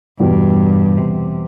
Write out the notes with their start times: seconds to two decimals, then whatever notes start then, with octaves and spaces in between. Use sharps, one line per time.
0.19 E2 G2 B2 G3 B3 F#4
0.98 C3